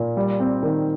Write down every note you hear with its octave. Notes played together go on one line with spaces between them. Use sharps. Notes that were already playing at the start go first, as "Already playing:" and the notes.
Already playing: A#2
G3
C4
D#3